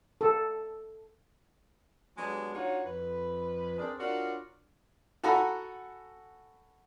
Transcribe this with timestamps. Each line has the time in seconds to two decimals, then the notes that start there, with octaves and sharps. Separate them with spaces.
0.21 A4
2.17 F#3 G#3 B3 D4 G4 G#4
2.54 D4 D#4 F4 F#4 C#5
2.85 F2 B4
3.78 C4 D4 G#4 A#4 D5
3.98 D4 F4 F#4 A#4 C#5 D5
5.23 F#4 A4 F#5 G#5 A#5 B5